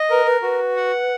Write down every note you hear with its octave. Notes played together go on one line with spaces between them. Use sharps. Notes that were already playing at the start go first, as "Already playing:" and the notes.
Already playing: D#5
A#4 B4
B4
F#4 B4
F#5